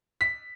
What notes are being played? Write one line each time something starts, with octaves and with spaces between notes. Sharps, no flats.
B6